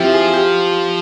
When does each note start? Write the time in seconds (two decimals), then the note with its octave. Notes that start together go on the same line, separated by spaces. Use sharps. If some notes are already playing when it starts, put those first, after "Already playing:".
Already playing: F3 C4 E4 G4
0.14 G#4
0.34 G4